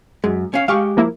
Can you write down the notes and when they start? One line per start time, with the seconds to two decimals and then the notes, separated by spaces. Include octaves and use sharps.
0.24 F#2 G#3
0.54 C#4 F5
0.68 G#3 G4 F5 C#6
0.97 F3 A#3 E4